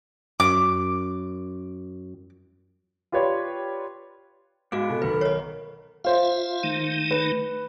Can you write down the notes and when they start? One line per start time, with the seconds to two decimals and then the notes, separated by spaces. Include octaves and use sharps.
0.40 F#2 D6
3.12 F4 G4 B4 C#5 D5
4.72 G#2 G#3 B3 F#4 D5 F5
4.90 B2 A4
5.02 B1 D#3 A#4 B4 F#5 B5
5.21 C#5 D#5
6.05 F4 C5 E5 F5
6.63 D#3 A3 D#4
7.11 B4